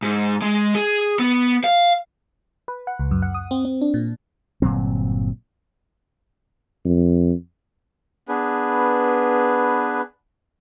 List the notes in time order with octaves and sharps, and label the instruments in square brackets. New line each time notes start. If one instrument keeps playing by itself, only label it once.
[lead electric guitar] G#2
G#3
G#4
B3
F5
[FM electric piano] B4
F#5
C#2
F#2
F#5
D#6
C4
C4
D4
A#2
[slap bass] G1 A#2 F#3 C4
[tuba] F2
[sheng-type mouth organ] B3 D4 G#4 B4